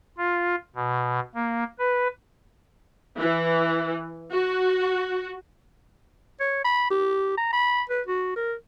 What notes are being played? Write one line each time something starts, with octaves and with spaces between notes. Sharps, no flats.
F4
B2
A#3
B4
E3
F#4
C#5
B5
G4
A#5
B5
B4
F#4
A#4